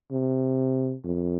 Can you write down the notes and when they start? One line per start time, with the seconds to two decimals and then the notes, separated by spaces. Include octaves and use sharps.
0.11 C3
1.04 F2